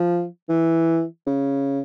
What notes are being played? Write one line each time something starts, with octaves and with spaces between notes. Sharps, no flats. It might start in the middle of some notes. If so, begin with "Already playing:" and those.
Already playing: F3
E3
C#3